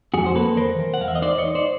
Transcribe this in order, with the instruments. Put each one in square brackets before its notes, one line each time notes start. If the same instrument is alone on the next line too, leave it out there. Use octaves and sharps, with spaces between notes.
[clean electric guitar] F2 F#4 G#4
C5
A#3 A4 B4
E3 A#4 C5
E3
F#5
E2 F5
E5
D#5
D#4 C5 D5
C#5 D#5
D#4
C5 D5